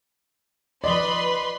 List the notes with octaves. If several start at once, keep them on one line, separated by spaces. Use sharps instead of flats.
F3 B4 D5 D#5 B5 C6